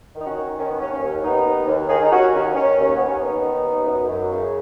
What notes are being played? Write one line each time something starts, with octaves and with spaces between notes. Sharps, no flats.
D#3 D#4
C#4 F#4
D#3
D#3 C#4
B3
D#2 C#4
C#4
D#2
D#2 B3 D#4
D#2
D#2
D#3 D#4 G#4
D#4
D#2 C#4 F#4
D#2 C#4
B3
D#3 C#4
D#2
D#2 B3
C#4
D#2 B3 D#4
D#3
D#2
F#2
F#2
C#3